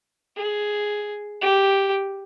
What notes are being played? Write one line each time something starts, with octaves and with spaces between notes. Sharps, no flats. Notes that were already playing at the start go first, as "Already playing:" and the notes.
G#4
G4